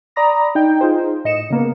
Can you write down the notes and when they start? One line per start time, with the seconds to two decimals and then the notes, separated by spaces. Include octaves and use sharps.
0.16 D5 A#5 B5 D#6 A#6
0.55 D#4 G5
0.81 D#4 F4 G#4 C5
1.25 A2 D#5 C#7 E7
1.50 C#3 A#3 B3